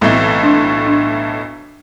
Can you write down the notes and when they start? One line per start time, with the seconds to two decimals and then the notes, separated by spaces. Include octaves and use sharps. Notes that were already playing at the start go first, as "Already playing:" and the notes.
0.01 B1 A2 E3 A3 C4
0.43 D4
0.86 D4